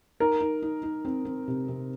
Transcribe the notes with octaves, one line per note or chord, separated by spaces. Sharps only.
D#4 A#4
D#4
D#4
D#4
C4
C4
C3
C3